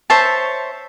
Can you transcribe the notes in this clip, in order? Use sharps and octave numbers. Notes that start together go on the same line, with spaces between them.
C5 C#5 E5 A5